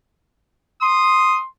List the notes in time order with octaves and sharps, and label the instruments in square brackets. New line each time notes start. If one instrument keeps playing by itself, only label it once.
[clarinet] C6 [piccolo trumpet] D#6